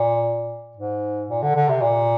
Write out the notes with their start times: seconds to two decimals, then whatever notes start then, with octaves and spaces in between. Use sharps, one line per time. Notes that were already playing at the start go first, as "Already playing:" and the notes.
Already playing: A#2
0.77 G#2
1.29 A#2
1.42 D3
1.56 D3
1.69 C3
1.82 A#2